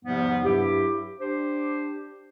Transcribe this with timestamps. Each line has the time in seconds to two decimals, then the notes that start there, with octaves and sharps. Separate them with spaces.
0.05 E2 G#2 C3 F3 G3 B3
0.44 G2 F#3 E4 G4
1.19 D4 G4 C5